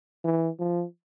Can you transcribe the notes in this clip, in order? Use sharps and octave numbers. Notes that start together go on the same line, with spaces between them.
E3
F3